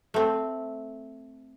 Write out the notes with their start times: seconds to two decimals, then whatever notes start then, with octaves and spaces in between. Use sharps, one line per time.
0.14 A3 C4